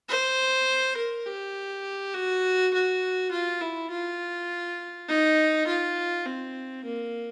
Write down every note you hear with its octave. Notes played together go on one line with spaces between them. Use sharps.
C5
A#4
G4
F#4
F#4
F4
E4
F4
D#4
F4
C4
A#3